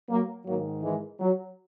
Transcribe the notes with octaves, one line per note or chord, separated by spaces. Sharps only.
F#3 A#3
G#2 D#3 F#3 A#3
E3 G#3
F#3